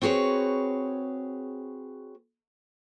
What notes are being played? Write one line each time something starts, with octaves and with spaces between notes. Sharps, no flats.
C4 F#4 G#4 B4 C#5